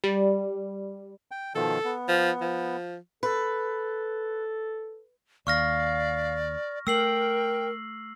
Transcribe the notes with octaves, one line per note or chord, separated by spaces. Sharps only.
G3
G5
B2 D#3 F3 A4
B3
F3
F3
A4 B4
D#2 D5 F5 C#6 F6 A#6
A3 A#4 G5 E6 C7 F#7